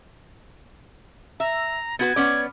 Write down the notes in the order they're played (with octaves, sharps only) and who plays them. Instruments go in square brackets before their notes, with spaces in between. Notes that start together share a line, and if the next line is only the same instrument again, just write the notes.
[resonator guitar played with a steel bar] E5 [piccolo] A#5
[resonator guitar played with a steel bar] B3 F#4 B4 [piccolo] G#6
[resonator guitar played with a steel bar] B3 C#4 D5